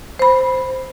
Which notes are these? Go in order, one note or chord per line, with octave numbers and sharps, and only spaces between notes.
C5 B5